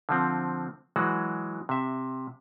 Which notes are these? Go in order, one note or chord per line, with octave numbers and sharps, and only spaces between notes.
D3 F3 C4
E3 F#3 G#3 F#4
C3 E5